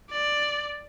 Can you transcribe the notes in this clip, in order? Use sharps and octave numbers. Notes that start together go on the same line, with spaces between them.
D5